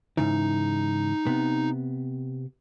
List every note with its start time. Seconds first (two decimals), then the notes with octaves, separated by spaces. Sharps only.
0.17 G#2 C#3 E3 D#4
1.26 C3 B3